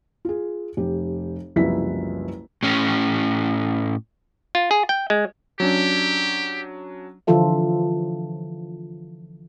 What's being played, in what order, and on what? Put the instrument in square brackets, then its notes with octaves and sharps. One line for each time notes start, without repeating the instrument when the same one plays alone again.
[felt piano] F4 G#4
F1 G4
F#1 C2 F3 E4 B4 B6
[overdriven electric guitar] A2 C#4
[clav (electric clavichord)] F4
G#4
G5
G#3
[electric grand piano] F#3 C#4 D4 [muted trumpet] G4
[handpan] D3 E3 F3 F4 A4 E5